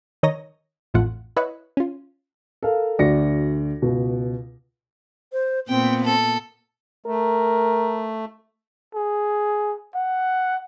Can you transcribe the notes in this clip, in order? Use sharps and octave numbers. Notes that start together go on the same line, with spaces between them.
D#3 C#5 D#5 A#5 D#6 A#6
A1 F2 A2 A3 F4 F#5
E4 B4 C#5 D#5 E5 F#5
C#4 F4
A4 A#4 F5
D2 F#4 D5 A#6 C#7
C#2 B2
C5
A#2 B3 C4 G5
A4
A3 A#4
G#4
F#5